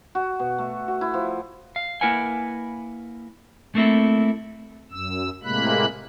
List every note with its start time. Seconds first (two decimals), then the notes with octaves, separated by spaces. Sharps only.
0.15 F#4
0.39 B2
0.58 A3
0.88 F#4
1.01 E4
1.14 F3
1.76 F5
2.01 A#3 E4 A#4 B4 F#5 G#5
3.75 A3 A#3 C4 E4 A4
4.91 F#2 E6
5.43 A2 C3 G#3 A#3 B5 F#6